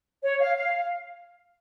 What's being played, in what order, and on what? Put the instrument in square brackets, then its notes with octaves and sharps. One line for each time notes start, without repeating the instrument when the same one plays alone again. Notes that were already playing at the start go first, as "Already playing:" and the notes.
[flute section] C#5
F5
F5